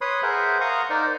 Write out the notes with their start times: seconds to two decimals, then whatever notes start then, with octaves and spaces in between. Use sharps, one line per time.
0.01 B4 C#5 B5 C6 D#6
0.23 G#4 A#4 C5 E5 F#5
0.61 F5 F#5 A#5 C6 C#6 D#6
0.90 D#4 A#4 C5 D5